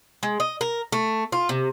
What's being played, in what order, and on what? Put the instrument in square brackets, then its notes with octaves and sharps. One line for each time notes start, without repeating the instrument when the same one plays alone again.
[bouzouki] G#3
D#5
A#4
A3
F4
C3